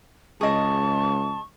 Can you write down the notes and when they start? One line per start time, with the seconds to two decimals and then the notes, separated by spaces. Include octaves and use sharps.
0.41 C#2 G#4 D#5 A5 C#6